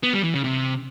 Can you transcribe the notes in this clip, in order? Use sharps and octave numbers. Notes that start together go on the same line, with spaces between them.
B3
G3
E3
C#3
C3